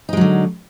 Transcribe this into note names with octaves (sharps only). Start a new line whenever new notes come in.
D3 F#3 G#3 D#4